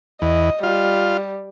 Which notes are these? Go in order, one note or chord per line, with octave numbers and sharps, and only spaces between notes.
E2 D#5
G3 F4